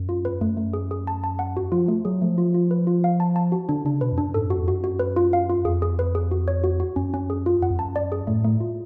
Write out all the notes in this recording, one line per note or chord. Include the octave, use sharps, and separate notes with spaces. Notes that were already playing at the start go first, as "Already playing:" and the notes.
Already playing: F#2
F4
B4
F#2 A3
A3
G#4
G#4
A5
A5
F#5
F#4
F3 F4
A3
F#3 G#4
F3 A3
F4
F4
B4
F4
F5
A5
A5
F#4
D3 D4
C#3 D4
B2 B4
F2
F#2 D4
G#2 A4
F#2 F#4
F2
F#2 F#4
F#4
B4
F4
F5
F4
F2 G#4
G#4
B4
G#4
F#4
C#5
F#4
F#4
F#2 C#4
C#4
G#4
F4
F#2 F#5
F2
F#2 A5
D5
G#4
A2 A3
A3
F4